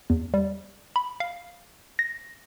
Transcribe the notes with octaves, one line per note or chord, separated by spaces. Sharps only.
E2
G3
B5
F5
A#6